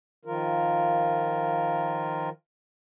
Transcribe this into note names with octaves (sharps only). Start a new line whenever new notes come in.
D#3 F3 F4 A#4